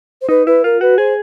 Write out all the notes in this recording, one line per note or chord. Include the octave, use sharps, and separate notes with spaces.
C5
D#4 B4
E4 B4
F4 A#4
F#4 B4
G#4 C5